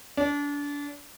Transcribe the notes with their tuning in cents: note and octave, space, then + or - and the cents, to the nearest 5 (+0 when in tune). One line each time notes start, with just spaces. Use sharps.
D4 -30